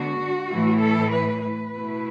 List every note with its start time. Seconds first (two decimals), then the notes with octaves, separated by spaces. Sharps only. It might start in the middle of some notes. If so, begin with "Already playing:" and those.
Already playing: D3 G#3 B3 D4 F#4
0.49 A2 E3 A3 E4
0.80 A4
1.11 B4
1.43 B4
1.73 B2 A3 E4